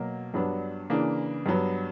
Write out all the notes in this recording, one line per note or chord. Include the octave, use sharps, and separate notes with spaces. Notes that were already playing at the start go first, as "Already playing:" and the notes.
Already playing: B2 F#3 A#3
G2 F#3 B3 D4
C#3 E3 A#3 D4
G2 F#3 B3